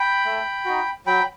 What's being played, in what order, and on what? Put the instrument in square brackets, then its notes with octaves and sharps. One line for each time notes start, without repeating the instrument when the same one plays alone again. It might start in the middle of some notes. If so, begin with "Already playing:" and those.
Already playing: [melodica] G5 B5
A3
D#4 F#4
F#3 G5 B5